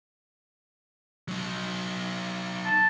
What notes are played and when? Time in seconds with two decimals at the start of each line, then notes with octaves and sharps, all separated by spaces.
1.28 F#3 D#4
2.66 A5